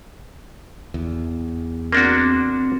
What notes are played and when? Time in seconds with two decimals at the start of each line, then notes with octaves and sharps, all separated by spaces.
0.94 E2
1.92 A#3 C4 D4 F#4